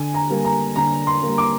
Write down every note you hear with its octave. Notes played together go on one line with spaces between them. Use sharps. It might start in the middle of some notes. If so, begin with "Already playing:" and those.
Already playing: D3 G#5
A#5
G3 A#3
A#5
D3 A#5
C6
G3 A#3
D6